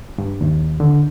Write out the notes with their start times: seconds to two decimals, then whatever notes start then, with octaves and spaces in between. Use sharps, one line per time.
0.18 G2
0.41 D#2
0.80 D3